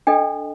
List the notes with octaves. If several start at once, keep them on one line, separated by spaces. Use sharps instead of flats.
D4 A4 D#5 G5